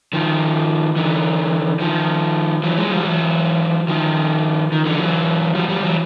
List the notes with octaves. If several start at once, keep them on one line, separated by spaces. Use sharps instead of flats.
D#3 F3
D3 E3
D#3 F3
E3 F#3
F#3 G#3
F3 G3
E3 F#3
D#3 F3
D#3
D3 E3
E3 F#3
F3 G3
F3 G3
E3 F#3